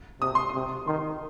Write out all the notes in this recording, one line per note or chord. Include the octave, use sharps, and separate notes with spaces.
C3 D#6
C6
D#6
C3
D#3 C6